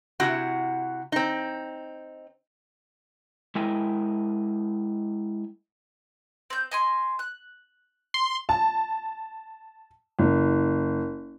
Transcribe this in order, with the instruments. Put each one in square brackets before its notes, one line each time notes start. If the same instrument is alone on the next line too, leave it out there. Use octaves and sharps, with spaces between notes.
[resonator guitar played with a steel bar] C3 E4 F#4 F#5
C4 D#4
[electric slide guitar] G#3 E4 A#4 E5 G5 G#5
[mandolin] C4 G6
D#5 G#5 C6
F#6
[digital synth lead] C6
[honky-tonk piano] A5
F#1